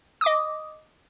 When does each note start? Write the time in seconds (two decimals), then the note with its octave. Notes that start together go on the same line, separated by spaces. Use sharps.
0.21 D#6
0.24 D6
0.26 D#5